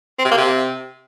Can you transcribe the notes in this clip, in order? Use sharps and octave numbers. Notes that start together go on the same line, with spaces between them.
C4
C3
A#3
C3